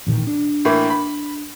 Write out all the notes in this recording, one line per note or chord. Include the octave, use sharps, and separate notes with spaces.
A1 A#2 D#3
D4
A2 E3 A#3
B5